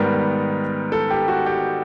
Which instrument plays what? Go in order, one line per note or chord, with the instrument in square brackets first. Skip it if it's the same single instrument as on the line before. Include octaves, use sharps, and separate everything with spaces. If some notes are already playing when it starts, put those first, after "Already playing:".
Already playing: [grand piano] G#2 D#3 G3 B3 A#4
A4
G4
F#4
G4